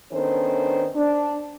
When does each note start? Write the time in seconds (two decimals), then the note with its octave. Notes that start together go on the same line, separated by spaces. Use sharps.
0.12 D#3 B3 C#4 D4 A4 C5
0.95 D4